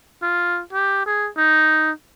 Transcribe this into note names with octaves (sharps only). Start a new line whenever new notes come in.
F4
G4
G#4
D#4